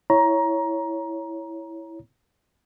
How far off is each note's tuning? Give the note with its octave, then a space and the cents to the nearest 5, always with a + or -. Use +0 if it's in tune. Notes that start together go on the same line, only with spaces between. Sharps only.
E4 +0 C#5 +0 A#5 +15